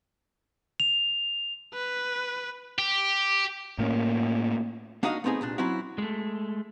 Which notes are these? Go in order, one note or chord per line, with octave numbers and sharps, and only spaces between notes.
F7
B4
G4
A2 A#3 C#4
A#3 D4 D#4 F#4 D#5 F5
A3 B3 C4 D#4 G#4
C2 A#2 D4
F#3 C4 C#4 E4 F#4
G#3 A3